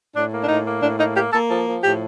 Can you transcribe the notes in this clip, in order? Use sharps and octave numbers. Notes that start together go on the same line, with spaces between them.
A2 D4
A#3
D4
A2 D#4
A#3
A2 D4
A#3 D#4
A#3 G4
A#3 A4
F3 A4
F3
A2 G4